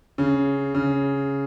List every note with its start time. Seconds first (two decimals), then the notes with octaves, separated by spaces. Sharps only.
0.18 C#3
0.75 C#3